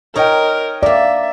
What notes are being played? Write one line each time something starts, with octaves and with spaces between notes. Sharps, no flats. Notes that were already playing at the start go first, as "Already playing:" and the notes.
D#4 A#4 C#5 D#5 G5 A#5
A#3 A#4 D5 E5